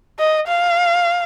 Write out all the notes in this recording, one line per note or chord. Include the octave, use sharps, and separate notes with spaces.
D#5
F5